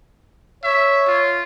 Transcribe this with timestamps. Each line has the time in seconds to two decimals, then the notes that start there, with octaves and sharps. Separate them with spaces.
0.63 C#5 E5
1.07 F4